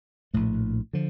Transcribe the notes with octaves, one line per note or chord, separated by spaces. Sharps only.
A#1 A2 A3
D3 F3